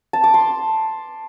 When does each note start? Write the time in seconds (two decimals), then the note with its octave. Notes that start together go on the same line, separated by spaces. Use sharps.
0.13 A5
0.24 D6
0.34 C6